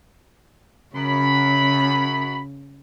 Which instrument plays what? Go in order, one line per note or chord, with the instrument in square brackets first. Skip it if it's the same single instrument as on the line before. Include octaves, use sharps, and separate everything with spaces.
[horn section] F#2 B5 [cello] C#3